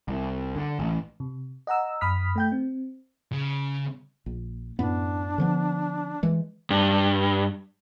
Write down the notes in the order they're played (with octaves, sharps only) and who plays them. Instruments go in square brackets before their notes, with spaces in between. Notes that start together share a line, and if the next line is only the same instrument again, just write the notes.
[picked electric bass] C2
D3
A1
[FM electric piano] C3
D#5 F#5 A#5 E6
F#2 B5 D#6 F6 B6
A3 G5 G6
C4
[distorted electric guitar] C#3
[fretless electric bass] A#1
[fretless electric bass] F#2 A2 B3 [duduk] D4
[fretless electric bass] D3 F3 B3
E3 G#3
[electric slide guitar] G2